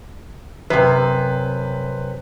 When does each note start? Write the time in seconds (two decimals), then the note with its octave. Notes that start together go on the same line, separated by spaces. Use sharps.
0.70 F#2 C3 B4